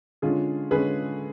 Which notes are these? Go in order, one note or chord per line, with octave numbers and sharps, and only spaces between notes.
D3 G#3 C#4 F4 G#4
D3 G#3 C#4 G#4 B4